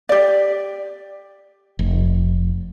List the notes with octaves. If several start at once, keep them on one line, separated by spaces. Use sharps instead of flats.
G4 D5
F1